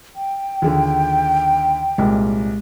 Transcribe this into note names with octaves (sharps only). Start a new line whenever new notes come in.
G5
D#2 D3 F4 G#4
C2 A#2 G#3